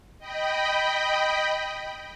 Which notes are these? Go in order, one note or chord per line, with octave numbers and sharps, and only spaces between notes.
D#5 G5 B5